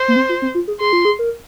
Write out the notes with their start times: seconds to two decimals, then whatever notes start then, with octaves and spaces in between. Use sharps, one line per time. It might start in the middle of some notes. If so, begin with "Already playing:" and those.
Already playing: C5
0.08 A#3
0.16 C4
0.29 F4
0.42 C4
0.55 F4
0.68 G#4
0.80 G#4 C6
0.93 F4
1.05 G#4
1.19 A#4